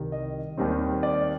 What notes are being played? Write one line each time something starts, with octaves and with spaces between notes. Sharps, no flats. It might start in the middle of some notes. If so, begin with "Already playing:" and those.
Already playing: C2 C3 D#3 G3
D#5
D#2 D#3 G3 C4
D5